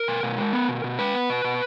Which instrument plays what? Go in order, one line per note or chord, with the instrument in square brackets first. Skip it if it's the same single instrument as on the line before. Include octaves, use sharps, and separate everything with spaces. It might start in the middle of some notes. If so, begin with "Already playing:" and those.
Already playing: [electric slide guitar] A#4
B2
B2
G#3
B3
B2
B2
G#3 B4
B3
B2
B2